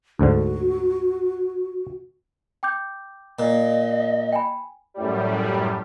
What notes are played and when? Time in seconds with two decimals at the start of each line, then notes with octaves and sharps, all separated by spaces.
0.19 D2 G#2 D3 F#4
2.63 G5 D6 G6
3.39 A#2 D#5
4.32 G5 G#5 B5
4.94 F#2 A2 G3